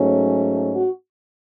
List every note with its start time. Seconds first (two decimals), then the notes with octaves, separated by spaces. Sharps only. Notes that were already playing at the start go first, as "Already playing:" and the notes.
Already playing: G#2 F#3 A3 C#4
0.72 F#4